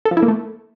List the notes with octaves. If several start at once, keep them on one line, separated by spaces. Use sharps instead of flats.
A4
F3
E4
A#3
A3